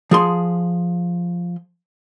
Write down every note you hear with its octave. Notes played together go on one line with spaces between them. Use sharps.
F3 G#4 C6